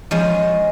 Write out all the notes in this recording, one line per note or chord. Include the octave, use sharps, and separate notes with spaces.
F3 G#3 C#4